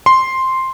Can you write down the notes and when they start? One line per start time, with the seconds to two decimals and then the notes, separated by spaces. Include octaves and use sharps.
0.06 C6